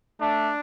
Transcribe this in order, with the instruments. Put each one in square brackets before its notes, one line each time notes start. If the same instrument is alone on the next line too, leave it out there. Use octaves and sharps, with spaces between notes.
[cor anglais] A3 [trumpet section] D4